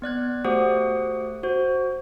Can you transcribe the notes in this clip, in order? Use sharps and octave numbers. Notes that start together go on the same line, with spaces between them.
B3 D5 F#6 G#6
A3 F#4 G4 C5 F#5 D#6
F#4 C5